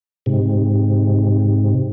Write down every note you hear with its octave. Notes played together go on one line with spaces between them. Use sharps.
G#2 C3